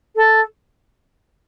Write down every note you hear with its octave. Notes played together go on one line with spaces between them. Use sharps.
A4